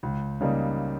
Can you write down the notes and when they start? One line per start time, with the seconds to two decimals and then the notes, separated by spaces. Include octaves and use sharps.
0.03 C#2
0.41 C#3 G3 A#3 D#4